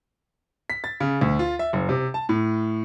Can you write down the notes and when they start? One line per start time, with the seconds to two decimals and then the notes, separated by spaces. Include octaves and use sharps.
0.70 B6
0.84 A6
1.00 C#3
1.21 D2
1.39 F4
1.59 E5
1.73 F#1
1.89 C3
2.14 A5
2.29 A2